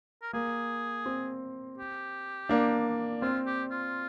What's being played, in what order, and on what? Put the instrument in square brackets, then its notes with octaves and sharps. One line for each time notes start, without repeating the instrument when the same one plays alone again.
[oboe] A#4
[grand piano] A#3 [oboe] G#4
[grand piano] C4
[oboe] G4
[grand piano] A#3 D4
[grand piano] C4 [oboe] F4
[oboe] G4
F4